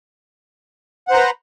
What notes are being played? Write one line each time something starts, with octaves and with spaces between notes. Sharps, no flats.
B4 C5 F#5 A#5